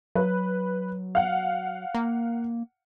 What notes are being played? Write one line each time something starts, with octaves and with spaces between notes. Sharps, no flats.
F#3 B4
F5 F#5
A#3